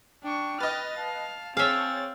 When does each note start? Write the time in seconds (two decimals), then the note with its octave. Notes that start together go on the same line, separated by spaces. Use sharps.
0.24 D4 G5 C#6
0.60 B4 D#5 F6 A6
0.97 F5 A5
1.57 C4 G#4 C#5 E5 F5 A6